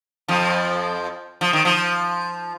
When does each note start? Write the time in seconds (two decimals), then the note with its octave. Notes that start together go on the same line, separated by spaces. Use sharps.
0.28 F2 F3
1.41 F3
1.53 D#3
1.65 F3